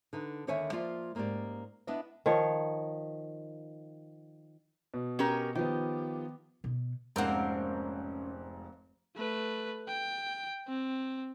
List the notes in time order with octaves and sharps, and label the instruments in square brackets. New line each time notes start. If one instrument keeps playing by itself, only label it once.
[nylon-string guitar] D3 D#4 B4
D#2 D3 D#3 C#5 E5 G#5
F3 A#3 F4 D5 E5
G#2 A#3 B3 C#4 G4 D5
B3 D4 E4 B4 D#5 E5
[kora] D#3 F3 C#5
[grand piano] B2
[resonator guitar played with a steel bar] C#4 G4 A#4
[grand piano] D#3 F3 B3 [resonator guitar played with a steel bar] G4
[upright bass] B2
[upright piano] F1 G#2 [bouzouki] A#3 C4 [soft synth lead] C#4 [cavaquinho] A#4 C#5 F#5
[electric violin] A3 B4
G5
C4